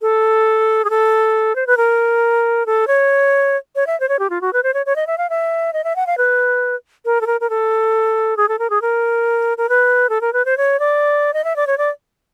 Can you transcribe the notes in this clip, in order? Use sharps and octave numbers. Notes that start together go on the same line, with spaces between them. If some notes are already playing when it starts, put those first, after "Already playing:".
A4
G#4
A4
C5
B4
A#4
A4
C#5
C#5
E5
C5
C#5
G4
F4
F#4
B4
C5
C#5
C#5
D#5
E5
F5
E5
D#5
E5
F#5
F5
B4
A#4
A4
A#4
A#4
A4
G#4
A4
A#4
G#4
A#4
A#4
B4
A4
A#4
B4
C5
C#5
D5
D#5
E5
D5
C#5
D5